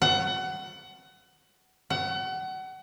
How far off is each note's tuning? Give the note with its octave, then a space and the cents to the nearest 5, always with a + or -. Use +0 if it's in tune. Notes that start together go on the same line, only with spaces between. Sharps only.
F#5 +25
F#5 +30